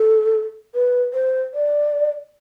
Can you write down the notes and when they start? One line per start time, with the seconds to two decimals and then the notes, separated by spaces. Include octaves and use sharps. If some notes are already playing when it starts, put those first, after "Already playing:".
Already playing: A4
0.74 B4
1.13 C5
1.54 D5